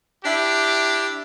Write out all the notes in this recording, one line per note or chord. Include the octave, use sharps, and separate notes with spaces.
D4 E4 G4